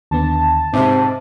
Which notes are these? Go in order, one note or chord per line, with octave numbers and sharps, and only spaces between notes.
D#2 D3 B3 A5
G#2 C3 C4 D#5 E5 D6